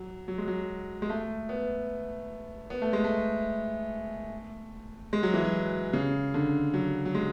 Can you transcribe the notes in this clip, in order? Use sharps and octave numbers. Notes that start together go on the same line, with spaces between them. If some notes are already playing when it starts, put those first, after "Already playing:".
Already playing: F#3
F#3
G#3
F#3
G#3
A3
B3
B3
A3
G#3
A3
G#3
F#3
E3
F#3
C#3
D3
F#3
F#3
G#3